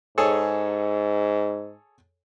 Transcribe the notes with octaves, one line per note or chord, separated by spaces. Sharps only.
G#2 G#4 A4 C#5